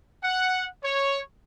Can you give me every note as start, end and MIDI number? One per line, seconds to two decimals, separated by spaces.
0.23 0.67 78
0.84 1.21 73